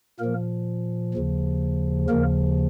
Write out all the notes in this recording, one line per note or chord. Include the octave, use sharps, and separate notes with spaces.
A#2 F3 A#3 A#4
D#2 C#3 F3
D#2 C#3 F3 A#3 A#4